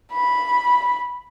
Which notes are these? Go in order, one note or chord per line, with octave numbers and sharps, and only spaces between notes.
B5